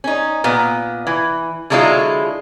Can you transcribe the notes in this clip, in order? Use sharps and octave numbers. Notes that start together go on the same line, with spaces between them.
C#4 D#4
A#2 B3
E3
D3 F#3 G#3 E4 F4 C#5